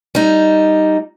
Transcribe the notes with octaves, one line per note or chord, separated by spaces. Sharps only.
G3 D#4